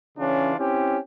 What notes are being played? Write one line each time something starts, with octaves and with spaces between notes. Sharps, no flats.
C#3 E3 C#4 D4 F4
C4 C#4 E4 G4